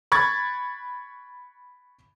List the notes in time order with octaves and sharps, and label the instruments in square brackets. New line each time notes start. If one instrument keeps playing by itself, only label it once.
[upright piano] B5 C#6 G#6 A6